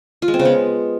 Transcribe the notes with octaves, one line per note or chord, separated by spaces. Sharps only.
F4
G#3
C4
C#3
B3